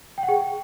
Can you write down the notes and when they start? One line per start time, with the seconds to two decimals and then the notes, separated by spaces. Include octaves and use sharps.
0.18 G5
0.23 F#5
0.28 G#4